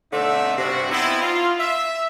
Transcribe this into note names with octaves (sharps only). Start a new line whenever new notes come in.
B2 D3 A3 C4 D#4 E5
G2 C3 F#4
B3 C4 D#4 E4
F4
E5